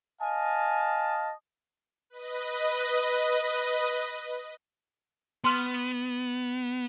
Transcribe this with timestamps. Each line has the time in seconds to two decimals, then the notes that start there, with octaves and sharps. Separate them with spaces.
0.21 D#5 F5 G#5 A5
2.10 B4 D#5
5.44 B3 C6 F6